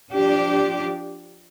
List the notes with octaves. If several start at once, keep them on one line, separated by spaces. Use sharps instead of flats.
F3 D4 G4